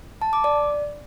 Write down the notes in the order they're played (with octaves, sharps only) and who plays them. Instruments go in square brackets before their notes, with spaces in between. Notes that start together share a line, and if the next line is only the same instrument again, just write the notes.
[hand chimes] A5
D6
D5